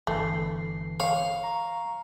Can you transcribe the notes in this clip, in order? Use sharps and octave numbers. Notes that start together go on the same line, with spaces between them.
G1 E3 A3 C7
C#5 F5
A#5 C#6